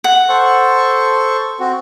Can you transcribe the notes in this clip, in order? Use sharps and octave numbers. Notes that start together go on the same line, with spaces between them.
F#5
A4 C5 C#6
C4 F#4